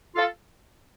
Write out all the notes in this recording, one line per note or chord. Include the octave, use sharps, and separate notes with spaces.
F4 A4